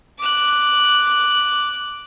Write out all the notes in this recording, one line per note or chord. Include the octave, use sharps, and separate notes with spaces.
D6 F#6